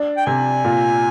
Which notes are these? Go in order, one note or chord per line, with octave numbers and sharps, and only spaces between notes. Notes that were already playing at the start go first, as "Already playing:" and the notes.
Already playing: D4
G5
C3 G#5
A#2